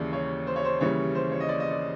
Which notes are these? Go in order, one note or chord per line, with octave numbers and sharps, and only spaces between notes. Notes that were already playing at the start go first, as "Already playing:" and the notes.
Already playing: D#2 C#3 E3 G3 D5
C#5
C5
C#5
C5
D#2 C#3 E3 G3 C#5
C5
C#5
D#5
D5
D#5
D5